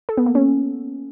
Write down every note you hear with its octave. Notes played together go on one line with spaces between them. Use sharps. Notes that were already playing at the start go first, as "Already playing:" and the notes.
A4
B3
A#3
C#4